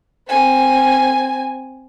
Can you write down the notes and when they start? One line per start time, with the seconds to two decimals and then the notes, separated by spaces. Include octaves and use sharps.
0.28 C4 G#5